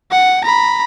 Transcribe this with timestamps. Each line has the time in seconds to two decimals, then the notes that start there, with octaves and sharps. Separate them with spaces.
0.11 F#5
0.44 A#5 B5